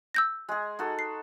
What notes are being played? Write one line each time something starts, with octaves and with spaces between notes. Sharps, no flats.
E6 G6 A#6
G#3 G#4
D#4 F#4 A4
C7